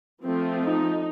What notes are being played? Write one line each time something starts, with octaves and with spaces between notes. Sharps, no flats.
F3 A3 C4
D#4